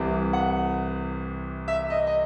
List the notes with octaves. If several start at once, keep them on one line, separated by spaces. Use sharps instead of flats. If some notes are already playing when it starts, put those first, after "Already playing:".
Already playing: C2 C3 E3
F#5
E5
D#5
D#5